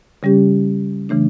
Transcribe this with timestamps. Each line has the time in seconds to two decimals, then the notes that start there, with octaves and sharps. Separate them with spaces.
0.23 C#3 G3 C#4 G4
1.09 C#3 E3 A3 D4